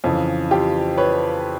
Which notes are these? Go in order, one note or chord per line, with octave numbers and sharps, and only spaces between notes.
F2 C#3 E3
F4 G4
B4 C#5